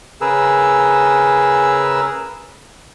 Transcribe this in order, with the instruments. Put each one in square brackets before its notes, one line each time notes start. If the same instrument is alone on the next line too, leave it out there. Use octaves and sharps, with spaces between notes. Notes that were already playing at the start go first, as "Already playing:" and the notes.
[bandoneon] C#3 G#4 A#4 B4 E6